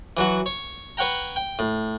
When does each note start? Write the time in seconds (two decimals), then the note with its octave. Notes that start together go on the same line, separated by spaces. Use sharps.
0.17 E3 F#3 F#4
0.46 C#5
0.97 B4 C#5 F#5 G5 A#5
1.36 G5
1.59 A2